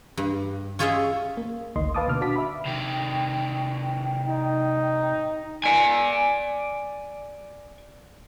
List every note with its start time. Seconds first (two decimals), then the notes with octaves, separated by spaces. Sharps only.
0.17 G2
0.79 C#4 F4 G#4 C#5 D#5 E5
1.37 A#3
1.76 G#1 D2 D#3 A#3 D#5 C6
1.94 B4 F5 A5 D6 D#6
2.08 B2 D3 D6 F6
2.21 D4 F#4 A5 D6 B6
2.36 E5 B5
2.65 C3 D#3 G5
4.26 D#4
5.64 D5 G#5